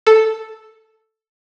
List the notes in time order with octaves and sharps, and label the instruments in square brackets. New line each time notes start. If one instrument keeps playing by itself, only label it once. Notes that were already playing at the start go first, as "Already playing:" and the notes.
[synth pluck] A4